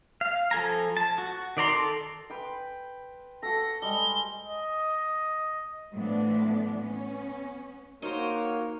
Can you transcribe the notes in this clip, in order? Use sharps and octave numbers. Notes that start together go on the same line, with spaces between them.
F5
F3 A4 G#5 A#5
A5
F#4
D#3 D5 A#5 C6
A4
B4 G5 C6
F#4 A4 A#6
G3 G#3 G7
D#5
A2 E3 F3 B3 D4
B3 C#4
A#3 D#4 F#4 A#4 C5 C#5